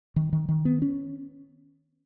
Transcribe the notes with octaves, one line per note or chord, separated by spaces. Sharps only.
D#3
D#3
D#3
B3
C#4